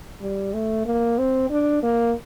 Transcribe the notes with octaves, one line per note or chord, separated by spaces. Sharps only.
G3
A3
A#3
C4
D4
A#3